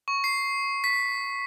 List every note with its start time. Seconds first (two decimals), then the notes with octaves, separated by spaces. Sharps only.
0.08 C#6
0.24 C7
0.84 B6